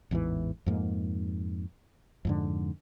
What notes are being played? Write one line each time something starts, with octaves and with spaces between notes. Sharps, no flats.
A1 E2 G#2 E3
F2 G#2 A#3
F2 G#2 D3